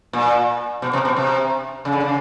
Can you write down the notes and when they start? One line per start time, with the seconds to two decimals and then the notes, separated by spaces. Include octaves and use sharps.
0.13 A#2
0.82 B2
0.93 C3
1.05 B2
1.17 C3
1.85 C#3
1.93 D3
2.00 C#3